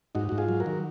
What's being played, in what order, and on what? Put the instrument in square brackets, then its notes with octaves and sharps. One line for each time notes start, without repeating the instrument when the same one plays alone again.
[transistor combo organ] G#2 D#4 F#4
G#2 F#4
F4 G#4
F#3
F#4 A#4
D#3